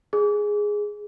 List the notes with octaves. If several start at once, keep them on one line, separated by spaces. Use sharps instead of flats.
G#4